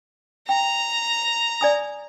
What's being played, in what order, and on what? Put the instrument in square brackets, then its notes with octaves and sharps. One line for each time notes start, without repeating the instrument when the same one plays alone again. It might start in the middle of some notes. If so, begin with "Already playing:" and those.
[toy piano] G5 [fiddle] A#5
[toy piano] D5 G#5 D#6